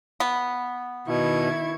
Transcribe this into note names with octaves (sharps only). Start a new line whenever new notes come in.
B3
B2 D#3 E4 C#6 G#6